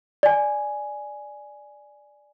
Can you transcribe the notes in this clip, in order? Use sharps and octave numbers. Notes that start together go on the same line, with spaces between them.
D5 G#5